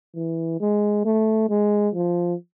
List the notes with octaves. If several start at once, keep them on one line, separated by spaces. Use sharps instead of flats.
E3
G#3
A3
G#3
F3